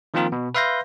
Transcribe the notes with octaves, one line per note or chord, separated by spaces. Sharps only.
D#3 F3 A#3 C4 F4 A#4
B2
B4 E5 F5 C6 G6 A#6